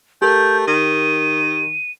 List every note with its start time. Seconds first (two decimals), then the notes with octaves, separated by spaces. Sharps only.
0.22 A3 G4 A#4 G6
0.67 D#3 D#7